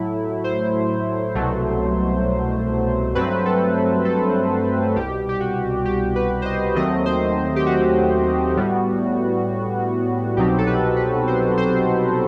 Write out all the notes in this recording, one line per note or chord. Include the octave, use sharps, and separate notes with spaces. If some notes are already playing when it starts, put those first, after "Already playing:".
Already playing: A2 F#3 A3 E4
C5
C2 B2 F#3 A3
G2 F#3 A3 C4 B4
A4
A4
C2 B2 G3 G4
G4
F#4
G4
B4
C5
D#5
D#2 D#3 F#3 A3 C4 D#5
C5
G4
F#4
A2 G3 B3
C2 B2 F#3 C4 D#4 G4
A4
B4
B4
C5
C5